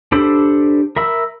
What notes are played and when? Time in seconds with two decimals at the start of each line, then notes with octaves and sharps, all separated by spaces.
0.12 D4 G4 A4 C5 B5
0.96 A#4 E5 B5 E6